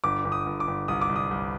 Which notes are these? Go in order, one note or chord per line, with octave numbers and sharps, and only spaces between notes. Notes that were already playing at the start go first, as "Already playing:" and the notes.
G1 D6
G1
D#6
G1
D6
G1
C2 D#6
D6
C2
D#6
C2